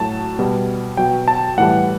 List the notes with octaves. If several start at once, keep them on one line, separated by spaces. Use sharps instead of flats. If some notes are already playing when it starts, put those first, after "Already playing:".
Already playing: A2 F#3 A5
B2 G3
B2 F#3 G5
A5
A2 E3 G3 F#5